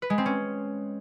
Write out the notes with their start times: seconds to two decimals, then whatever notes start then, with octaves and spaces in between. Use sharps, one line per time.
0.02 B4
0.10 G#3
0.18 C4
0.26 C#4